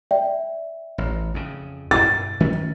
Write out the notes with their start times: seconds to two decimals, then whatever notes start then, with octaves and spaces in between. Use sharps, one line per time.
0.11 D5 E5 G5
0.98 A1
1.34 F2 C#3
1.91 G2 B2 A6
2.40 D#3 A3 C#4